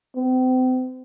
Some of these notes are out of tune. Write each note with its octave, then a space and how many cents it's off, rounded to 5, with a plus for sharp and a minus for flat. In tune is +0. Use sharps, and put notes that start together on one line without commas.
C4 -40